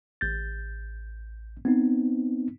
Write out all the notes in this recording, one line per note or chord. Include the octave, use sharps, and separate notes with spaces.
A1 G6 A6
B3 C4 D#4